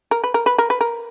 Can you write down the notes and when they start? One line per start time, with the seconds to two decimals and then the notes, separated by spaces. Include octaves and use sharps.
0.11 A#4
0.24 B4
0.34 A#4
0.46 B4
0.58 A#4
0.70 B4
0.81 A#4